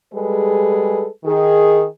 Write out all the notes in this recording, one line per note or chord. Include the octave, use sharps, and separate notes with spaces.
G3 G#3 G#4 A4 B4
D#3 G#4